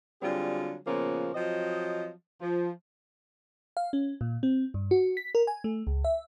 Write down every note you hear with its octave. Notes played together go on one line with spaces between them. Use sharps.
D3 F#3 G3 C4 F4 G#4
A#2 C#3 F3 A#3 B3 C#4
F3 F#3 C4 D#5
F3
F5
C#4
A#2
C4
G2
F#4
B6
A#4
G#5
A3
C#2
E5